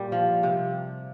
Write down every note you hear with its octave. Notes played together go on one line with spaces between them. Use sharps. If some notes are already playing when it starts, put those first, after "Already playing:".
Already playing: A#2 G3
F3
C3